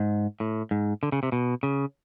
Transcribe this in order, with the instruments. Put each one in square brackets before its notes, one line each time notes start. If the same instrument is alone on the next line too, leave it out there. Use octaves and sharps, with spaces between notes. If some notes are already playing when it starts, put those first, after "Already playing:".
Already playing: [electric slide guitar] G#2
A2
G#2
D3
C#3
C3
B2
C#3